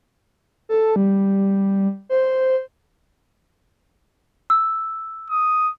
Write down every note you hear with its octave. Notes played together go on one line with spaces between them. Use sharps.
A4
G3
C5
E6
D#6